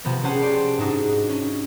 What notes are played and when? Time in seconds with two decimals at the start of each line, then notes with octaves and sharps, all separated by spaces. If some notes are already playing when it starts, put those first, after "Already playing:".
0.05 C3 F3 B3
0.24 C#4 G4 G#4 C5 F#5 A5
0.41 G4 D5 C6
0.78 G#2 D4 D#4 F#4
1.30 C#4